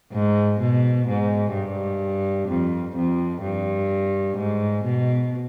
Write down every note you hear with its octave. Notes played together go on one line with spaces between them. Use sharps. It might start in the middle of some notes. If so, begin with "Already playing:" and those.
G#2
B2
G#2
G2
F2
F2
G2
G#2
B2